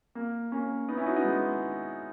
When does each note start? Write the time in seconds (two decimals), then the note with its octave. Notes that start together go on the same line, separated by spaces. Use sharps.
0.15 A#3
0.52 A#3 C#4
0.88 B3 D#4
0.97 C#4 E4
1.06 D#4 F#4
1.16 B3 D#4
1.25 G#3